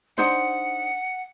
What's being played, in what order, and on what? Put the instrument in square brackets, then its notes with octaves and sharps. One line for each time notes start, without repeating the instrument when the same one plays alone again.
[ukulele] D4 D#4 C5 [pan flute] F#5